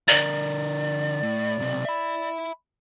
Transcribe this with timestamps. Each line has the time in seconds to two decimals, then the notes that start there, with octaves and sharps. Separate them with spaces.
0.08 D3 A#4 D5
1.23 A2
1.59 B1 C3
1.85 E5 B5